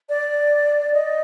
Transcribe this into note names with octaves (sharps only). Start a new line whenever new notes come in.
D5
D#5